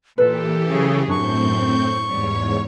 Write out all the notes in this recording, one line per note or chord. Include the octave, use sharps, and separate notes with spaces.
A#2 E3 G4 A4 B4
C#3 F#3 G#4
F#2 A2 C4 D4 C#6 G6
E2 G#2 G3 C#5